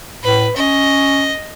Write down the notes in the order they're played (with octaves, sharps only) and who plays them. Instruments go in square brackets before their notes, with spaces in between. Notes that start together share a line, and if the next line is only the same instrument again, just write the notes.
[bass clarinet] A2 [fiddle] B4
[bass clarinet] C#4 [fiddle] D#5